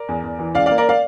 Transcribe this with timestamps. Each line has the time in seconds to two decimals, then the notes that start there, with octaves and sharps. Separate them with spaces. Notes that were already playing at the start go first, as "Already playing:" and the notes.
Already playing: A#4 D5
0.08 E2
0.23 E2
0.39 E3
0.55 C#2 D5 F5
0.66 A#3 D5 F5
0.78 A#4 D5
0.89 D5 F5